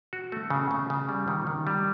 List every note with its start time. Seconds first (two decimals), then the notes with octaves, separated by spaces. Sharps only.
0.13 F#4
0.32 A3
0.50 C#3
0.71 C#3
0.90 C#3
1.09 G3
1.28 D#3
1.47 D#3
1.67 G3